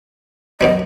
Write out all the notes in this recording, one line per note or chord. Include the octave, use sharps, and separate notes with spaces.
F#2 B2 G3 D#5